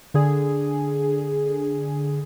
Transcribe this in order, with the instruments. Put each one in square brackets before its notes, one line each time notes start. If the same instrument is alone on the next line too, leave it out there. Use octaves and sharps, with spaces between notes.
[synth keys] D3 G#4